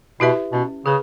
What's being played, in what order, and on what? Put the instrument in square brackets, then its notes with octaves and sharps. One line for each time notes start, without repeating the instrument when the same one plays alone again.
[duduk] B2 [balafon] E4 G4 B4 E5
[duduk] B2 [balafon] C#4
[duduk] C#3 [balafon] G#4 B4